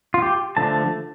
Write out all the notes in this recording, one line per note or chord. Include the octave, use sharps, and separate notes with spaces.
F4
G4
D3 F3 A3 D4 A5